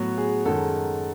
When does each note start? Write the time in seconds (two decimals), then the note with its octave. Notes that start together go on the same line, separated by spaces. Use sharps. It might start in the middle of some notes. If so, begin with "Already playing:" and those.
Already playing: A2 F#3 B3 F#4
0.18 G#4
0.45 F#2 D#3 G#3 A4